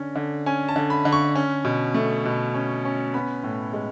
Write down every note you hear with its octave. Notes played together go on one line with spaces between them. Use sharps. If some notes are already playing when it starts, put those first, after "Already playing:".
Already playing: D3 C#4
D3
C#4 G#5
A5
D3
B5
D3
C#6
C#4
B2
A3
B2
C#4
C#4
B3 B5
A2
G#3